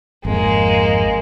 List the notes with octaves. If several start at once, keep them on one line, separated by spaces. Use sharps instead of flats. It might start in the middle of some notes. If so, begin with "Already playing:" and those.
G#1 F2 G#3 A#3